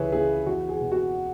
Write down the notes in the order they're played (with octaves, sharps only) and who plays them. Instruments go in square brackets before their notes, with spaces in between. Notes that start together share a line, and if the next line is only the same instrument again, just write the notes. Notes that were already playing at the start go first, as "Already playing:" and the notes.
Already playing: [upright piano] C#2 C#3 E3 G#4 B4 C#5 E5
C#3 E3 G#4
E2 F#4
G#4
B2
F#4